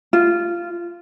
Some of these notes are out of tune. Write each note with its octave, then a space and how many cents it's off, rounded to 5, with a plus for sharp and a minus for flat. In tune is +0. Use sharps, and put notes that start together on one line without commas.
F4 -15